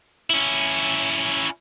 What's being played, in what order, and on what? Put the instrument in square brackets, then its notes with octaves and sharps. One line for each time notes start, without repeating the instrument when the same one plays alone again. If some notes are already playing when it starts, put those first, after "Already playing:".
[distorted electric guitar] C#4 E4